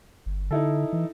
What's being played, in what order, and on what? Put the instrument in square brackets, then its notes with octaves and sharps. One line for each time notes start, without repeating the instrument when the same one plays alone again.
[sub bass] G1
[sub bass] D3 [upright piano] D#4 E4 A4
[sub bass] E3